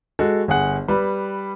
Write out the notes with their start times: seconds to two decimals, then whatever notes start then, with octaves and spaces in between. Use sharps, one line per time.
0.19 G#3 F#4 A4
0.48 G1 G#4 F#5
0.88 G3 B4